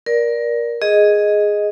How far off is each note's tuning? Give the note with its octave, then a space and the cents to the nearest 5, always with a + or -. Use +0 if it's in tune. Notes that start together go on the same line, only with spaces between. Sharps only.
A#4 +20 D5 +0
G#4 +0 D#5 +0